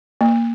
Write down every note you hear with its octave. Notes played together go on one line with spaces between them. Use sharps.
A#3